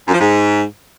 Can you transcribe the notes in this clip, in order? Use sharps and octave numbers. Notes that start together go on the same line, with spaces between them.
F#2
F3
G#2